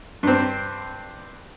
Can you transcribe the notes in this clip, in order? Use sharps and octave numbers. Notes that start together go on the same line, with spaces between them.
G2 C4